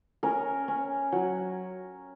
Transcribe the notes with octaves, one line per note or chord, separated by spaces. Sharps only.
C#4 A#4
C#4
F#3